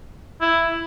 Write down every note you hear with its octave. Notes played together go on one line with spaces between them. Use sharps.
E4